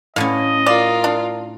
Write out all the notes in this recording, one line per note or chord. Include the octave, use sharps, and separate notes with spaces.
A2 D3 C#4 D#5 F5
F4 A#4 D5
D4